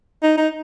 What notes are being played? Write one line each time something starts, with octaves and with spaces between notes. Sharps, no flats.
D#4
D#4